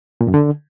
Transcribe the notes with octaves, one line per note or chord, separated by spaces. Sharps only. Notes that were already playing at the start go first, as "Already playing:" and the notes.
A#2
F#2
D3